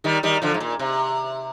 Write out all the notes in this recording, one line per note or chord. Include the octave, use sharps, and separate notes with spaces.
D#3 G3
D#3 G3
D3 F3
G#2
A#2
C3